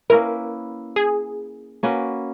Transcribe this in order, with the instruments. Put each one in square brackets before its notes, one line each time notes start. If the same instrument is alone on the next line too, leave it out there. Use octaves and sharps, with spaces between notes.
[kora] A#3 C#4 E4 B4 [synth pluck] A#4
[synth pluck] G#4
[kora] A#3 C#4 F#4 B4